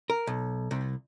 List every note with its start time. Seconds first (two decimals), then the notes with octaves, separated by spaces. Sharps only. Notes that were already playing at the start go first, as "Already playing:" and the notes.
0.10 A#4
0.27 B1
0.71 C2